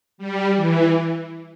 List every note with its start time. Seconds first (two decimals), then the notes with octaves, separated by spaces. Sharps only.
0.18 G3
0.56 E3